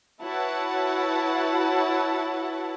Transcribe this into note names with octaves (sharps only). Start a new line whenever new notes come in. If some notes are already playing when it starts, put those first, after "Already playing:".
E4 F#4 B4 C#5 F#5 A5